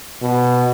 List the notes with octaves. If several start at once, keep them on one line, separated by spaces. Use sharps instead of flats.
B2